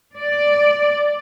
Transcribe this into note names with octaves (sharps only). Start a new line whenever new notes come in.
D5